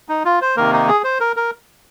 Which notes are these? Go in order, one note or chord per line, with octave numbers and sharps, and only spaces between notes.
D#4
F4
C5
C3 D#3 A#3 A#4
D#4
G#4
C5
A#4
A#4